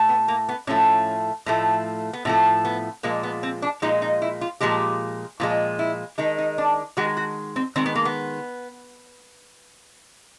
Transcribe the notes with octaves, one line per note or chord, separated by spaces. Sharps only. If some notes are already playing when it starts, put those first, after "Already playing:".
Already playing: A2 A3
B3
A#3
B3
A2 F3 A3 C#4
A2 F3 A3
B3
A2 F3 A3 C4
B3
A#2 F3 G#3 A#3
B3
C4
D4
A#2 F3 G#3 D#4
D#4
E4
F4
A#2 F3 G#3 G4
A#2 F3 G#3 F4
E4
D#3 G#3 D#4
D#4
D4
D#3 G#3 F#4
F#4
C4
D#3 G#3 C4
B3
A#3
B3